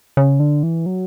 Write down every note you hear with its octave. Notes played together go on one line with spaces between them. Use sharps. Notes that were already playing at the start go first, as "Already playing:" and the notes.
C#3
D3
E3
F#3